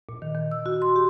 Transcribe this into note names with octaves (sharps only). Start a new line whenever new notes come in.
A#2
D#3
D#3
E6
F#4
C6
G4